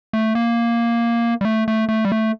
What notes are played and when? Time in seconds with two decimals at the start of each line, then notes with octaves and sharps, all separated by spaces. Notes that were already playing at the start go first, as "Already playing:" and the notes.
0.13 A3
0.35 A#3
1.41 G3
1.45 A3
1.68 A3
1.89 A3
2.05 G3
2.12 A3